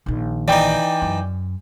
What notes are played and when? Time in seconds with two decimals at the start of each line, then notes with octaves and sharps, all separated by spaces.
0.06 A#1 D#3
0.48 E3 D#4 D5 G5 D6
1.02 F#2